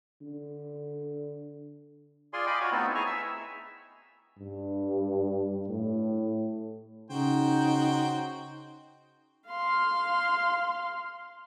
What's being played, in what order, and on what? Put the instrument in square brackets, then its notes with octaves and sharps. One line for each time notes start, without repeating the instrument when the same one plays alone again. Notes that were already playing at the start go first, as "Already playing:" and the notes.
[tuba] D3
[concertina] F4 G#4 D5 G#5 C6
D#5 G5 G#5 B5 D6
F4 F#4 C#5
A3 B3 C4 D#4 E4 A4
E4 G#4 G#5 A#5 C#6
E5 E6
[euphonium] G2
A2
[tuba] C#3 [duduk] D#4 [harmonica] F#4 C5 G5
[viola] F5 C6